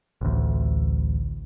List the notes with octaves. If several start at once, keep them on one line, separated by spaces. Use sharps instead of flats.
A1 D2